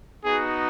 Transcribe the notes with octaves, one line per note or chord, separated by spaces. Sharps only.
B3 D#4 F#4 G#4